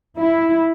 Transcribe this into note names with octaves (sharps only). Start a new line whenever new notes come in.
E4